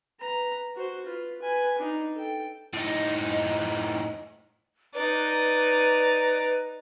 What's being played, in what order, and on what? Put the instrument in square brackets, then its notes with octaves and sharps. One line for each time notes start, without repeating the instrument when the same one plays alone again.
[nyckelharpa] B4 A#5
F#4 C5
F4 B4
B4 G#5
D4 D#4
A4 G5
[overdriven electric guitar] A2 D#4
[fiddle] D#4 D5 [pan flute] B4